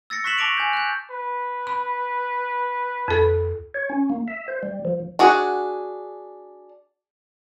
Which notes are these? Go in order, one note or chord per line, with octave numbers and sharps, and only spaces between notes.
E6 A6 A#6 C#7
C#6 F#6 B6 C7 E7 F#7
A5 C#6 D6 A#6 D7 F7
G#5 G6
F#6 G6
B4
B5
F2 A4
C#5
C#4
A#3
E5
C5
G3
F3
D4 F#4 G#4 F#5